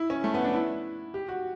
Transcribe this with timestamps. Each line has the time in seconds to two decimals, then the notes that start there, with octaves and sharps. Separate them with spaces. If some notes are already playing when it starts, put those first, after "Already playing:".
Already playing: E4
0.10 C#4
0.24 A3
0.34 B3
0.44 D4
0.54 E4
1.14 G4
1.28 F#4